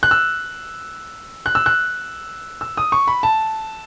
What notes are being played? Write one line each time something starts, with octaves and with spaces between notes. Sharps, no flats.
F#6
E6
F#6
E6
F#6
E6
D#6
C#6
B5
A5